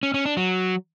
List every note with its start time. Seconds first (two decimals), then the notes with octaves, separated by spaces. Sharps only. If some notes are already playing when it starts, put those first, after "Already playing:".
0.03 C#4
0.14 C#4
0.26 D4
0.37 F#3